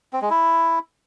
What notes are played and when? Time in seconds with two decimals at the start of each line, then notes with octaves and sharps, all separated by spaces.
0.13 C4
0.22 G#3
0.30 E4